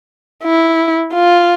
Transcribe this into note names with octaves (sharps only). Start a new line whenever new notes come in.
E4
F4